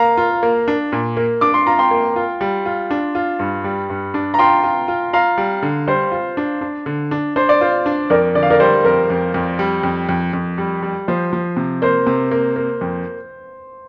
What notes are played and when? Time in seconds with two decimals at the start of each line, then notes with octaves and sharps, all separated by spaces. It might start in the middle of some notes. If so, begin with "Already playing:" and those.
Already playing: A#3 F5 A#5
0.17 F4
0.43 A#3
0.68 D4
0.92 A#2
1.17 A#3
1.41 D4 D6
1.54 C6
1.67 F4 A#5
1.79 G5 C6
1.91 A#3
2.16 F4
2.41 G3
2.66 F4
2.91 D4
3.15 F4
3.39 G2
3.64 G3
3.90 G2
4.14 D4
4.34 A#5
4.39 F4 G5 C6
4.64 F4
4.88 F4
5.13 F4 F5 A#5
5.38 G3
5.62 D3
5.88 G3 C5
6.12 F4
6.37 D4
6.61 D4
6.86 D3
7.11 D4
7.36 D4 C5
7.49 D5
7.61 F4 C5
7.86 D4
8.10 F2 A#4 D5
8.35 D3 D5
8.43 F5
8.50 A#4 D5
8.60 G3 C5
8.85 F2 A#4
9.10 F2
9.34 F2
9.59 G3
9.83 F2
10.09 F2
10.33 F2
10.58 G3
10.83 G3
11.08 F3 C5
11.33 F3
11.57 C3
11.82 A#3 C5
12.07 C3
12.31 A#3
12.56 A#3
12.81 F2